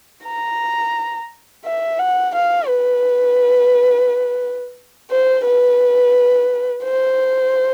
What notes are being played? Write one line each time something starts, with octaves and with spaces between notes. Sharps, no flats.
A#5
E5
F#5
F5
B4
C5
B4
C5